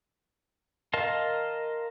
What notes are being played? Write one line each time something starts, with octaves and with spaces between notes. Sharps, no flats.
A#4 D#5 F5 A5 C6